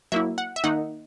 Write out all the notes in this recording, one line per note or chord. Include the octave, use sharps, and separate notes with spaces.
F#3 A#3 E4 E5
F#5
E5
D#3 A#3 D#4 F#5